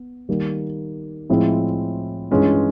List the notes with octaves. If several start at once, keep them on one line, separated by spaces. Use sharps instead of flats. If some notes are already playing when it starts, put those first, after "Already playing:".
Already playing: B3
D#3 G3 A#3
A2 F3 G#3 C4 E4
G2 E3 G#3 C#4 F4